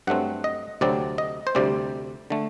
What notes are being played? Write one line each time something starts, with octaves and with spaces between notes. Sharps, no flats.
G2 F#3 A3 C4 F#5
D#5
D2 C3 F#3 C4 D5
D#5
C5
D2 C3 G3 C4 D5
D3 A3